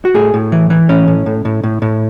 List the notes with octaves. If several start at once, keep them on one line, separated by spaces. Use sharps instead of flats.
F#4
A2 G#4
A2
E3
E3
A2 C#4
A2
A2
A2
A2
A2